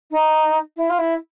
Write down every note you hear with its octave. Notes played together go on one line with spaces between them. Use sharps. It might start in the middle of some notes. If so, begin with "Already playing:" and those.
D#4
E4
F4
E4